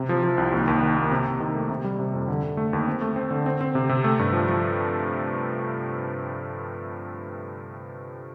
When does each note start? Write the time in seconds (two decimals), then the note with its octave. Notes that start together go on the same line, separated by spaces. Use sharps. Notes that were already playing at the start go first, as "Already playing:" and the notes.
Already playing: C3
0.09 F3
0.23 F3
0.38 C2
0.52 D#2
0.68 D#2
0.83 D#3
0.97 A#3
1.11 C3
1.27 C3
1.40 D#3
1.55 A3
1.70 C3
1.84 G3
1.99 C3
2.14 F2
2.28 D3
2.43 D3
2.57 A3
2.73 D#2
2.87 C4
3.01 A3
3.16 C4
3.31 D3
3.46 C4
3.61 C4
3.75 C3
3.89 C3
4.04 A3
4.19 G2
4.33 F3
4.49 F3